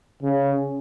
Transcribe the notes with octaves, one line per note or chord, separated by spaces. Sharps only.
C#3